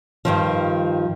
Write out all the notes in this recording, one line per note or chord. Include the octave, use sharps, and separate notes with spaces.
G2 D#3 F3